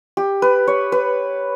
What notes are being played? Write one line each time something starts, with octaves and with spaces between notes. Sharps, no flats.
G4
B4
C#5
B4